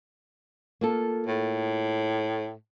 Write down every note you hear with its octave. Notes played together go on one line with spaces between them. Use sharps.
A#3 F4 A4
A2